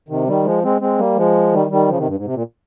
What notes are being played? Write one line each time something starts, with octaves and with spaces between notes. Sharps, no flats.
C3 D#3
D#3 G3
F3 G#3
G#3 C4
G#3 C4
G3 A#3
F3 G#3
D#3 G3
D#3 G3
C#3 F3
C3 D#3
G2
G#2
C3
A#2